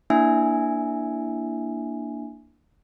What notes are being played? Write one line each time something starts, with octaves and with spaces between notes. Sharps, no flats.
A#3 D4 E4 E5 G#5